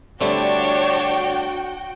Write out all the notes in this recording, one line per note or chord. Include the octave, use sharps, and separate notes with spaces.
D3 G3 A3 C4 D4 F#4 C#5 G5